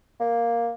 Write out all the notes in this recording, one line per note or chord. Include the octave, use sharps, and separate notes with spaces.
A#3